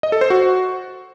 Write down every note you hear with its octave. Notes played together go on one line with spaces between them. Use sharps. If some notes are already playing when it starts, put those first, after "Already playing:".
D#5
A4
C5
F#4